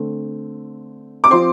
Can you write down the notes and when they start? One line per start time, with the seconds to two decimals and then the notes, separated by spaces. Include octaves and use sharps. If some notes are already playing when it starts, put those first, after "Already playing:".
Already playing: D3 A3 C4
1.24 D6
1.30 F3 C4 C6